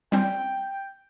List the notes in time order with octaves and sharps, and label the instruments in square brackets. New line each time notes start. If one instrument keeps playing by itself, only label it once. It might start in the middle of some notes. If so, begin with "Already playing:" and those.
[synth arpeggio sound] G3 C4 C#4 [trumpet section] G5